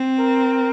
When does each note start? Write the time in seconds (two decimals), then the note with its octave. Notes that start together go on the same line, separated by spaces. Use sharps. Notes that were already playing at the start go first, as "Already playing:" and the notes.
Already playing: C4
0.19 A#4